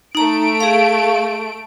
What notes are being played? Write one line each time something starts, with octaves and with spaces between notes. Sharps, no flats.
A3 D#4 A#5 D7
G#4 F5